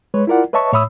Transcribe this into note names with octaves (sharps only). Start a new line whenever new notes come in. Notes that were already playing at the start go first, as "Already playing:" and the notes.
G#3 B4 C#5
E4 F4 A#4 D5 F#5
B4 C#5 D#5 E5 A5 C#6
A2 C#5 E5 B5 D#6 E6